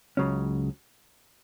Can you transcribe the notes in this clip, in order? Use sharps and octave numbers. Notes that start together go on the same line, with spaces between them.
C#2 C#3 F#3 C#4